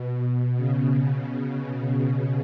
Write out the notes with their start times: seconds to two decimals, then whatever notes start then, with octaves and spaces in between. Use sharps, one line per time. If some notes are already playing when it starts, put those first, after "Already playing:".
Already playing: B2
0.24 B2
0.57 C#3